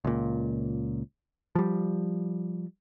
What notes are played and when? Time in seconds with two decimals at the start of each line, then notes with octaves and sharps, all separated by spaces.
0.05 C#2 A#2
1.55 F3 G3